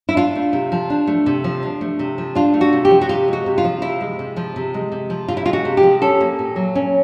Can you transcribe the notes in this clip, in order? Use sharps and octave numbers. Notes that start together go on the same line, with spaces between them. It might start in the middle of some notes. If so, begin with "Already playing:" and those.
E4
D4 F4
A3
C3
F3
D4
A3
C3
F3
D4
A3
C3
F3
D4 F4
A3
F#4
C3
G4
F3
F#4
C3 F4
G#3 F#4
C3
F4
F3
C3 E4
G#3
C3
F3
C3
G#3
C3
F3
C3 F4
E4
G#3 F4
F#4
C3
G4
F3
C#4 A4
A#3
A#2
F#3
C#4